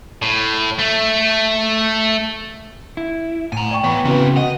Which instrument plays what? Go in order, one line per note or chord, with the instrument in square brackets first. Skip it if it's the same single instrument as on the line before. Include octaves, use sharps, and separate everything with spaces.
[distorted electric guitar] A2
A3
[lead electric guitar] E4
[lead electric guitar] A2 [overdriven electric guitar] G#5 A#5
[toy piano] D5 G5 C#6
[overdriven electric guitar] E3 [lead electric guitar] B3 [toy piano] C#5 F#5 G5
[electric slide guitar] C#3 [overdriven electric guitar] E3 C4 [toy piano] E4 F#4 B4
[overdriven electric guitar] D#5 [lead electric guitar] F#5